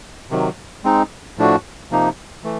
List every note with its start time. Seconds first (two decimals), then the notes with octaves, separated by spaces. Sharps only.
0.30 C3 D#3 F#3
0.84 G#3 C4 D#4
1.37 A2 F3 A3 D4 F#4
1.91 C3 F3 A#3 D#4
2.44 E3 A3